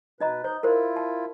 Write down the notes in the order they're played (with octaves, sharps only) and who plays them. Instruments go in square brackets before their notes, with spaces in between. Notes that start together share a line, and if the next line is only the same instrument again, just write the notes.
[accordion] B2 B4 [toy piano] D#4 D#5 A#5
[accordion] D#4 G6 [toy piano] C5
[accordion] E4 F4 [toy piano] A#4 C5
[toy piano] A5